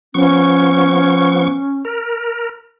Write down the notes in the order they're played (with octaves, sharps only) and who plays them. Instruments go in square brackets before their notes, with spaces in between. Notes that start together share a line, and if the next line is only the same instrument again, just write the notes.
[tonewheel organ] F3 B3 C#6 [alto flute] C#4
[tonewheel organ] A#4